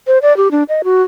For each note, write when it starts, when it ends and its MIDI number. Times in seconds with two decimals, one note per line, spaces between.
0.07 0.18 72
0.22 0.35 74
0.37 0.51 67
0.51 0.63 62
0.69 0.82 75
0.84 1.02 66